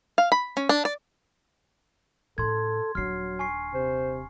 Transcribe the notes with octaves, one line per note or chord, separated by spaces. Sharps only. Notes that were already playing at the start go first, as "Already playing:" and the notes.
F5
B5
C#4
D4
D5
A2 C#3 A4 C6 G#6
D#1 F#3 D4 F6 C7
G#5 C#6 C7
C3 C5